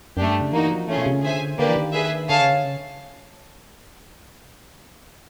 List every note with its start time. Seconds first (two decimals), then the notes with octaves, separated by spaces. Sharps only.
0.17 F#2 A3 D4 G4
0.29 G2
0.41 C#3
0.52 E3 A#3 D#4 F#4
0.71 F3
0.87 E3 A3 C#4 F4 G#4
0.97 B2
1.06 C3
1.14 C#3
1.23 D3 G#4 C5 E5 G#5
1.58 D3 A#3 D4 G4 B4 D5
1.69 E3
1.76 D#3
1.94 G#4 B4 E5
2.29 D3 G#4 C#5 F5 A5
2.40 C#3
2.52 D3
2.64 C#3